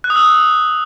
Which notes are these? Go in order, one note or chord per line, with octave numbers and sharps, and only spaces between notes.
F#6
D#6
E6